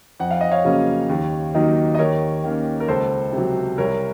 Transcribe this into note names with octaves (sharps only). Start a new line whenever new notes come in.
F2 F#5
F5
D#5
C#5 F5
C#3 F#3 A#3 C#4
D#2
D#3 F#3 A#3 D#4
D#5
D#2 A#4 C#5
D#3 A#3 C#4
A#4
C#2 A4 C5
C3
F#3
C2 A#4 C#5